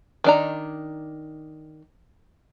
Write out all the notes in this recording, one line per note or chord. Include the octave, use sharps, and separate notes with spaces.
D#3 D4 A#5